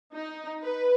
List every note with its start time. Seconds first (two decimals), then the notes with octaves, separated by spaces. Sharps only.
0.13 D#4
0.62 B4